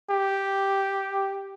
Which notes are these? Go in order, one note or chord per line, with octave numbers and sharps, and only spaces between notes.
G4